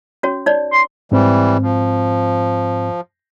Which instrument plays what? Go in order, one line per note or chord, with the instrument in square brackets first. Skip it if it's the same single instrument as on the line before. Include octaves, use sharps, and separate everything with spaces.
[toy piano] C#4 F#4 C#5
D#4 C#5 D5
[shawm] C6
[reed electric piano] G#2 C4 [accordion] E3 G3
[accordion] F3